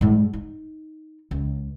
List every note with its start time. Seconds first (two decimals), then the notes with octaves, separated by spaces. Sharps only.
0.01 G#2 G3
0.33 D#4
1.31 C#2